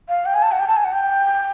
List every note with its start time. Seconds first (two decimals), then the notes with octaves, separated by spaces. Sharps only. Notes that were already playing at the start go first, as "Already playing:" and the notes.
0.09 F5
0.26 G5
0.34 G#5
0.43 A5
0.51 F#5
0.59 G5
0.68 A5
0.76 G#5
0.84 F#5
0.93 G5